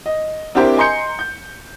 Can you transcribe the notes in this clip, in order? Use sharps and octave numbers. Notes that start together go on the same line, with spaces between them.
D#5
C4 D4 E4 G4 A#4 C5
D#5 G#5 A#5 C6 G6 C#7
G6